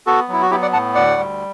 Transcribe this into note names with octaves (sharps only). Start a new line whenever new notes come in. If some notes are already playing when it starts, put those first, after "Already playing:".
B3 F#4 A4
F#3 E4
F#4
B3 E4 G4
D5 F#5
A2 F#5 A5
D2 D5 F#5
G3